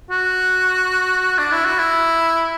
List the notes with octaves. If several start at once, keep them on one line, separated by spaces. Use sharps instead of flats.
F#4
D4
E4
F#4
E4